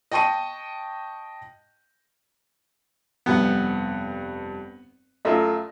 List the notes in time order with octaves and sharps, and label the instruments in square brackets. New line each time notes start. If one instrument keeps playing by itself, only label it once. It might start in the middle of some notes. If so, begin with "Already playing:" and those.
[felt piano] D#5 G5 A5 C#6 D#7
[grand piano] F1 G2 F#5 [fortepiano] B3
[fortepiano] F#2 A3 F4 [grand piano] D#5